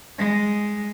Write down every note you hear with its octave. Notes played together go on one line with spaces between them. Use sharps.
G#3